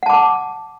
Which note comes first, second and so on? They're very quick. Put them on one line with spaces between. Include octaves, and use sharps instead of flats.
F#5 A5 D6